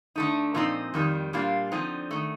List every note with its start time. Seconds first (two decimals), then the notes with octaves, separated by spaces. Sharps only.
0.16 D3 A3 D#4
0.55 A#2 F3 C4 D#4
0.94 F2 D#3 G3
1.33 A#2 G3 A#3 D4 F4
1.72 D3 F3 C4 D#4
2.11 D#3 A3